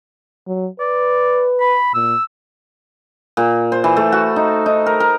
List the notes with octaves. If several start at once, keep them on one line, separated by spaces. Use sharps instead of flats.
F#3
B4 D5
B5
A#2 E6
A#2
C5
E3
A3
F#4
D#4
D#4
A#4
A#4